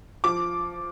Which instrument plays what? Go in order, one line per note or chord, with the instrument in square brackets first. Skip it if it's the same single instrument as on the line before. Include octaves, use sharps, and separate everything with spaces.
[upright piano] F3 D6